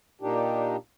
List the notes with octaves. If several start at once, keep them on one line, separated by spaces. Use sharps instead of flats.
A#2 A#3 D4 D#4 G4